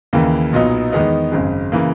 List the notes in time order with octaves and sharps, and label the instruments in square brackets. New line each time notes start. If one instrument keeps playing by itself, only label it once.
[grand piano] D#2 C#3 E3 A#3
B1 A#2 F#3 B3 D#4
E2 D#3 G#3 B3 D#4
G#1 F#2 C#3 G#3
C#3 E3 A#3